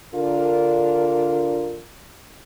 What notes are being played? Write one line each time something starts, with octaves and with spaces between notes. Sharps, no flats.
D3 D4 F4 A#4